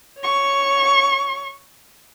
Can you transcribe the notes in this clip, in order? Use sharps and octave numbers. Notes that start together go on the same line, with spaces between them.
C#5 C#6